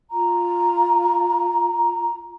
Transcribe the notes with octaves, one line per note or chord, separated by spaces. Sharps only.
F4 A#5